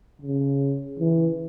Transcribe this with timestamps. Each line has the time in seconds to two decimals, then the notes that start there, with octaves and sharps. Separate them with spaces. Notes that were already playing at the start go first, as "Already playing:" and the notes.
0.22 C#3
0.99 E3